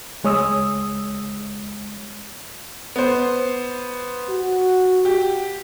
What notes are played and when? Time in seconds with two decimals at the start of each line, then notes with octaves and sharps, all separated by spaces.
0.24 C#2 G#3 C#5 D#6 E6
2.96 B3 C5
4.31 F#4
5.05 G4